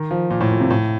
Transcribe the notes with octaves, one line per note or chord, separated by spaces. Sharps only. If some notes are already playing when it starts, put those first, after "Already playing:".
Already playing: D#3
F3
A#2
A2
A#2
C3
A2